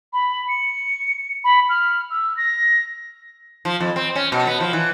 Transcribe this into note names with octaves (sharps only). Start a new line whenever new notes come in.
B5
C#7
B5
F6
E6
A#6
F3
F2
C4
C#4
B2
B3
F3
E3